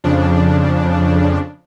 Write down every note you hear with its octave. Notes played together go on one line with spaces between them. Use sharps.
F2 C#3 F3 D4